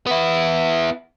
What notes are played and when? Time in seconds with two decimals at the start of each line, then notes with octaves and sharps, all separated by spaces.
0.06 B3 E4